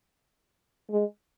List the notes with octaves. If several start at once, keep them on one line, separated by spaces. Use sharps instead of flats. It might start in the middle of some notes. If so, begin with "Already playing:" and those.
G#3